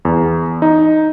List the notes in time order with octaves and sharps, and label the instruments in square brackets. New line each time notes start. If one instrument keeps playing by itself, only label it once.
[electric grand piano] E2
D#4